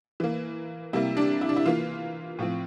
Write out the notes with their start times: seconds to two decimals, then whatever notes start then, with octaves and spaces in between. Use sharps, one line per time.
0.20 E3 A#3
0.93 C3 G3 A#3 E4
1.17 D4
1.41 E4
1.49 D4
1.56 E4
1.66 E3 A#3 F4
2.39 A2 F3 C4